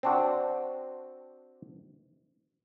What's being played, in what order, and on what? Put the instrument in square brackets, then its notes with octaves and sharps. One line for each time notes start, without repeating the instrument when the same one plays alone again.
[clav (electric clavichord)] C4 D4 F#4